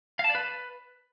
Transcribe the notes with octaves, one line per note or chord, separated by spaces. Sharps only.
F5
A5
D5
B4